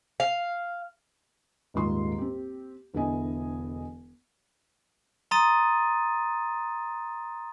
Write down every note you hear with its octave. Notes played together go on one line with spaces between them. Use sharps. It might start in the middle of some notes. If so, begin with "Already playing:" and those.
F5
D#1 G#2 D#3 G#3 F4 C6
C4 G4
E1 D3 B3 E4 D#5 G#5
A#5 C6 D#6 A6 D#7